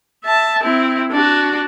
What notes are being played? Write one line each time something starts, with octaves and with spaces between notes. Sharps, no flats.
E5 A5
C4 E4
D4 F#4